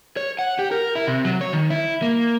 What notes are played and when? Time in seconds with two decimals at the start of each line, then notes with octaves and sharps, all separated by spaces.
0.17 C#5
0.39 F#5
0.59 G4
0.72 A#4
0.95 E4
1.07 C3
1.25 F#3
1.41 C#5
1.53 D#3
1.70 E4
2.02 A#3